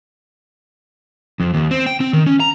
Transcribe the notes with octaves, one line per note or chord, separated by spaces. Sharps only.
F2
D#2
C4
G5
C4
D#3
C#4
A#5